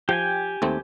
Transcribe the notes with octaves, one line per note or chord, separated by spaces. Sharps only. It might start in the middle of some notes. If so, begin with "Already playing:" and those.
F3 G4 G5 G#5
D#2 A3 C4